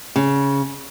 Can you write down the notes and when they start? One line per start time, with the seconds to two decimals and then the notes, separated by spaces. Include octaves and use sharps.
0.16 C#3